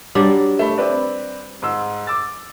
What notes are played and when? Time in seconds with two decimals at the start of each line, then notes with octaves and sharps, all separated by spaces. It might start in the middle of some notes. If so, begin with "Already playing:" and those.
0.15 F#3 G3 D4
0.59 A3 B5
0.78 C4 B4 D5
1.62 G#2 C6 E6
2.07 D6 E6 A6